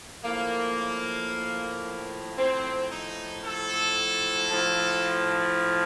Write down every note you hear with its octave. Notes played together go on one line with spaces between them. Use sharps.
A2 F3 A#3
A2 F3 C4
D#4
A4
A2 F3